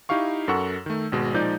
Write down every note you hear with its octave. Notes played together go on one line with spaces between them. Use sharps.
D#4 E4 G4 F5 C#6
F#2 A4 A#4 F#5 C#6 E6
D#3 A3
G#1 B2 G#3
A#2 F3 G#3 D#4 D5 G6